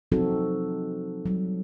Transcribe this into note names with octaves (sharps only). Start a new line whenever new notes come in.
F3 F#3 C4 D#4 F#4 A4
F#3 G3